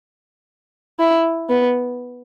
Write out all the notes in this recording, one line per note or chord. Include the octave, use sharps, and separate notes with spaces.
E4
B3